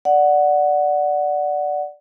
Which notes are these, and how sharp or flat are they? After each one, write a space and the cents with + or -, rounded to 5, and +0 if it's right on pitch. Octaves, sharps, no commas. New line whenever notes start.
D5 +0 F#5 +0